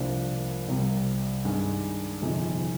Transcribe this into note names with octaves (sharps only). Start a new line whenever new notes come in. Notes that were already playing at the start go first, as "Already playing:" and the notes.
Already playing: C2 C3 F3 A#3 D4
C2 C3 G3
G2 D#3 G#3
G1 F2 C3 D#3 G#3